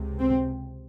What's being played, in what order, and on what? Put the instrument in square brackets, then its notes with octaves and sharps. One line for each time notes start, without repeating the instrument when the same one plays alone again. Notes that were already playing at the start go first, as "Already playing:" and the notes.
Already playing: [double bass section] C#2 C3
C4